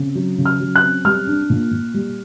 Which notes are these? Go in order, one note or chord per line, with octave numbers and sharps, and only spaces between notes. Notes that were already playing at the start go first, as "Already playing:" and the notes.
Already playing: C#3 C4
F#3
C#3
F6
F#3
F#6
C4
G3 F6
D4
A#2
A#2
G3